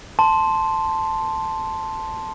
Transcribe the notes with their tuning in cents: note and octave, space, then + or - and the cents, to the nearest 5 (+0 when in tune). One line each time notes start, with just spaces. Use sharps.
A5 +0 C6 +0